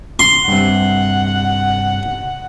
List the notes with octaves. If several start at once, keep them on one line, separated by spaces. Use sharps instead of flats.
C6
G2 C3 F#5